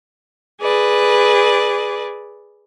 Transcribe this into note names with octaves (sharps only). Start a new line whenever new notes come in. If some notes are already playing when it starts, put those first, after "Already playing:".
G#4 B4 D5